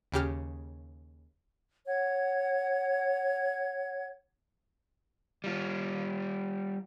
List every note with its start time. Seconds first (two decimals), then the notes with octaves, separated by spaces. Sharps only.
0.12 D#2 C#3 G4 F6
1.87 C#5 F#5 G#6
5.44 G3 F4